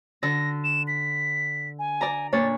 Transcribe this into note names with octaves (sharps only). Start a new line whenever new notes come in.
D3 A#6
E7
B6
G#5
D5 A#5
A#2 D4 C#5 A6